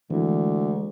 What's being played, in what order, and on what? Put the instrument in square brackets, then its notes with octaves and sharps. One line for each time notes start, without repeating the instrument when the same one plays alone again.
[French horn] D2 [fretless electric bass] E3 [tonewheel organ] G#3